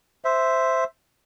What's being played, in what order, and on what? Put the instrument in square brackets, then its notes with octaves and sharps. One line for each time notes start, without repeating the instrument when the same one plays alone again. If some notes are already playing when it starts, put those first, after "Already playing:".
[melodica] C5 E5